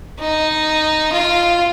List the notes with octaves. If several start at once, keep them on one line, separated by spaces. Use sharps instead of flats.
D#4
F4